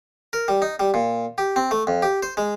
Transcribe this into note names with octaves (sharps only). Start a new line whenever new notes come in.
A#4
G3
D#4
G3
A#2
G4
C4
A3
F2
G4
C5
G#3